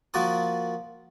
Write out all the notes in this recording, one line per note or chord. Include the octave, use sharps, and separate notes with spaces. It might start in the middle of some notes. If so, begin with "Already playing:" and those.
F3 A#3 F#4 A#4 A5 D#6